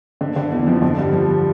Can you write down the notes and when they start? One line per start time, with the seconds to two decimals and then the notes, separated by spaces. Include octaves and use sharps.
0.21 D3
0.36 D3
0.51 E2 E3
0.67 F2 F3
0.82 D3
0.98 G2 G3
1.13 F3
1.27 G3